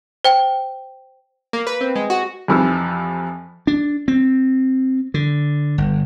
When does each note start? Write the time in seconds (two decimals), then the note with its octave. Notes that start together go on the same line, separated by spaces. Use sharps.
0.25 C5 G5
1.53 A#3
1.67 B4
1.81 C4
1.96 G#3
2.10 F#4
2.48 F2 C3 E3 F3
3.67 D4
4.08 C4
5.14 D3
5.78 G1